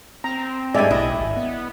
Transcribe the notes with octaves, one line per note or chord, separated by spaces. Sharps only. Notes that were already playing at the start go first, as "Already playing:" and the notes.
C4 A#5
G2 G#3 D5 E5 G#5
B1 E4 D#5
G#1
B3